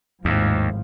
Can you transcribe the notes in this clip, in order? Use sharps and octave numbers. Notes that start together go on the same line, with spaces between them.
G#1 D#2 A2 F3